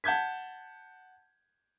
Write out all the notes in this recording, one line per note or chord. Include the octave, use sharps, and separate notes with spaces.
F#5 A5 G6 G#6 B6